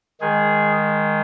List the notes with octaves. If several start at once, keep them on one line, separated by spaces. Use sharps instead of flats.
D#3 G#3 G#4